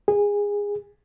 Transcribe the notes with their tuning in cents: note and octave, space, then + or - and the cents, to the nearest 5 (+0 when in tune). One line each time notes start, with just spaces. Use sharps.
G#4 -20